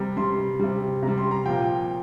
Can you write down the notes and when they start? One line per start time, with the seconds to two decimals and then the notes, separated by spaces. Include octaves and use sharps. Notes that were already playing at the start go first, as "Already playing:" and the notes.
Already playing: C3 G3 A#5
0.17 C3 G3 C6
0.60 C3 G3
1.02 C3 G3 A#5
1.18 C6
1.31 A#5
1.46 A#2 F3 G5